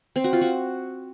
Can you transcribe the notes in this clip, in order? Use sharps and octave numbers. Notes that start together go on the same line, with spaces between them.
C4
F#4
F4
F#4